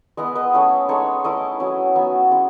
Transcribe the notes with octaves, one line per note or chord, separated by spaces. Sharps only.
G#3 B3 E4 D#5 F#5
B4 D#5
A3 C#4 E4
G#3 D#4 A4 C#5
A3 E4 B4 D#5
F#3 C#4 E4
F#3 B3 D#4 C#5 E5
G#3 C#4 E4